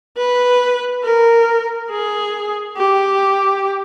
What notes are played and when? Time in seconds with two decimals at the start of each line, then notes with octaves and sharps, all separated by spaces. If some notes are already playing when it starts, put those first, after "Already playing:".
0.18 B4
1.03 A#4
1.91 G#4
2.77 G4